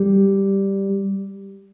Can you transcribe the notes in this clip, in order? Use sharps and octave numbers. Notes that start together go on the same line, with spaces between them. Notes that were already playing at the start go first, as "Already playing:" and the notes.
Already playing: G3